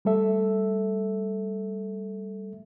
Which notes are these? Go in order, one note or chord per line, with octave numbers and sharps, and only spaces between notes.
G3 A3 A4 E5